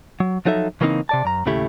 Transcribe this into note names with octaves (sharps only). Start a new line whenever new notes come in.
F#3
F3 F#3 D#4 A4 E5
C#3 E3 A#3 C4 D4 D#4
C3 D5 A5
F#2 A#5
D#2 A2 C#3 A3 E4 G4